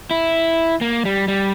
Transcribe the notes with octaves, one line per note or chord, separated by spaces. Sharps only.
E4
A#3
G3
G3